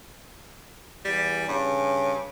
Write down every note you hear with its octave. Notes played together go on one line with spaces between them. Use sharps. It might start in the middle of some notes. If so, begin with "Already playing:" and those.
E2 G3
G2 C#3